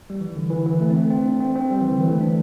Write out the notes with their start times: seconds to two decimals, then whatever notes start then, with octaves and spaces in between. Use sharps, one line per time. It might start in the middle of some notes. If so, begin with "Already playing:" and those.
0.10 G3
0.21 E3
0.36 D3
0.50 E3
0.66 E3
0.81 A3
0.90 C4
0.96 A3
1.10 C4
1.26 D4
1.41 C4
1.56 C4
1.71 G3
1.80 E3
1.91 D3
2.01 E3
2.11 A3
2.21 D4